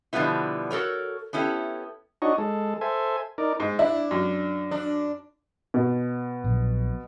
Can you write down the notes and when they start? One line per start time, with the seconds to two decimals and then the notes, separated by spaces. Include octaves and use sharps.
0.13 B2 D3 F3 G3 B3 E4
0.71 F#4 A4 A#4 C#5
1.33 B3 C#4 E4 G4 A4
2.22 D4 D#4 F#4 C#5 D#5
2.38 G#3 A4
2.81 A4 C5 E5 G#5
3.38 D#4 A#4 D5
3.60 G#2
3.79 D4 E4
4.11 F#2
4.71 D4
5.74 B2
6.44 A#1 A#2 F#3